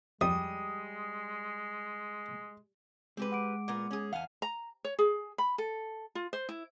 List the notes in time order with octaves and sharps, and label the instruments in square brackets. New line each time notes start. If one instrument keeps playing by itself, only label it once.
[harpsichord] F2 [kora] G3 [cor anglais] G#3 [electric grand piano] D#6
[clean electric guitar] G#3 [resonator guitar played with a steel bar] C4 G4 B4
[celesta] F#5 D6 D7
[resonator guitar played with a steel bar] A#2 B3 A#4 [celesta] D6
[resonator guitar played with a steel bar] C#4 G#4
[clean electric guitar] E2 F#5 [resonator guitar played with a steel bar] F5 G#5
[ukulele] A#5
C#5
G#4
B5
A4
F4
C5
E4